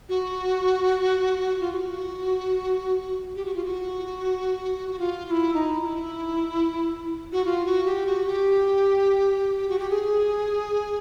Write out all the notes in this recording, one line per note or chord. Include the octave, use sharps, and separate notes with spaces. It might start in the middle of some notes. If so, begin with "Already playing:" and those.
F#4
F4
G4
F#4
G4
F#4
F4
F#4
F#4
F4
F4
E4
D#4
F4
E4
F#4
F4
F#4
G4
F#4
G4
F#4
G4
G#4